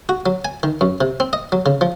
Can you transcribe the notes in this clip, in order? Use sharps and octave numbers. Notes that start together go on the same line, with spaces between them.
F#4
F#3
G#5
D#3
F#2
C3
C4
D#5
F#3
C#3
F3